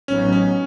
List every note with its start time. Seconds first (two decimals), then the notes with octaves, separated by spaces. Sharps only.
0.08 A1 A2 F#3 B3 C#4 D#4
0.33 C#4